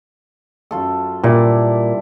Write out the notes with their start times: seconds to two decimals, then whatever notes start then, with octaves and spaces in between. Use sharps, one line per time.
0.71 F#2 F4 A4
1.24 G2 A#2 E4 D5